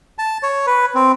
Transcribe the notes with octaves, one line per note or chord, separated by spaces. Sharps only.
A5
C#5
B4
C4